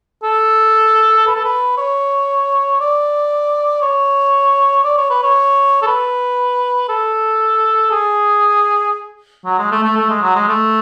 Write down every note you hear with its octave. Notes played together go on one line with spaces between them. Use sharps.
A4
B4
A4
B4
C#5
D5
C#5
D5
C#5
B4
C#5
A4
B4
A4
G#4
F#3
G#3
A3
A3
A3
G#3
F#3
G#3
A3